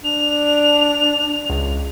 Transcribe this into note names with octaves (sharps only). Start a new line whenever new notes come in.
D4 F7
C#2